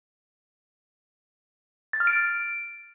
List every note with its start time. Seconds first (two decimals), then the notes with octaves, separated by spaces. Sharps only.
1.93 A6
2.00 F6
2.07 D7